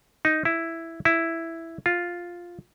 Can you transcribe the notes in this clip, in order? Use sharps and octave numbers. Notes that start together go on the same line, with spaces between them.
D#4
E4
E4
F4